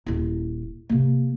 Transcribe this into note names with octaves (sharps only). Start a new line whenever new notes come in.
D#1 E4
C3 A#3